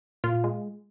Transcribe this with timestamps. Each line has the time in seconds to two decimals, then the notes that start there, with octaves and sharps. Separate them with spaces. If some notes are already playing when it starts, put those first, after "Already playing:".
0.24 A#2 F4
0.44 G#3